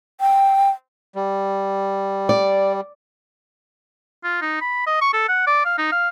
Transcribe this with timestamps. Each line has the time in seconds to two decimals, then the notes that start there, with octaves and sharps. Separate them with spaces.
0.21 G5
1.15 G3
2.29 D5
4.24 F4
4.42 D#4
4.61 B5
4.87 D#5
5.01 C#6
5.14 A4
5.29 F#5
5.47 D5
5.65 F5
5.78 D#4
5.92 F5